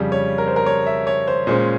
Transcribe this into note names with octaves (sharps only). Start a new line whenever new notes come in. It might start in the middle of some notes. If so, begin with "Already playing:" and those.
Already playing: F2 C#3 G3
C#5
A#4
C5
A#4
C#5
E5
C#5
C5
A#2 G#3 C#4 C5